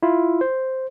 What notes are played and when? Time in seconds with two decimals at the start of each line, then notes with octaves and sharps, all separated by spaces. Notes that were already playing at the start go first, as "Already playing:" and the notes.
0.03 E4 F4
0.41 C5